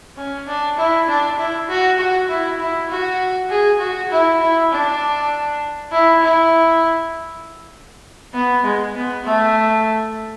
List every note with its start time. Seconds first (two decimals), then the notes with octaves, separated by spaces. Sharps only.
0.17 C#4
0.47 D4
0.78 E4
1.08 D4
1.38 E4
1.69 F#4
1.99 F#4
2.28 E4
2.59 E4
2.89 F#4
3.49 G#4
3.80 F#4
4.11 E4
4.41 E4
4.71 D4
5.92 E4
6.22 E4
8.34 B3
8.64 G#3
8.95 B3
9.24 A3